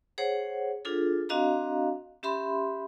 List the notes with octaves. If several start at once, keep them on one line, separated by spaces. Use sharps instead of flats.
G#4 C5 C#5 F#5
D4 F4 G#4 A4
C4 D4 F#4 D#5 F5 A#5
C#4 G4 E5 B5 C6